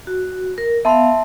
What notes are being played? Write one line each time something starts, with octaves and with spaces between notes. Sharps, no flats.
F#4
A#4
B3 E5 F5 A5 C6